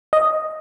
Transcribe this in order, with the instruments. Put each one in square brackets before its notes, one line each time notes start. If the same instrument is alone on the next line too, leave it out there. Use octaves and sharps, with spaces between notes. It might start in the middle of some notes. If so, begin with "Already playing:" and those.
[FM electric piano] D#5